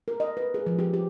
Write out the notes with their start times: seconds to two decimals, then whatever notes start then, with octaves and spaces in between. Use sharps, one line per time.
0.08 A#4
0.20 D#5
0.37 B4
0.54 G#4
0.66 F3
0.79 G4
0.94 G4